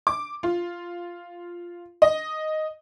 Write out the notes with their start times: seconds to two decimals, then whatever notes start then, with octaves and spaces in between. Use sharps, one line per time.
0.07 D6
0.43 F4
2.02 D#5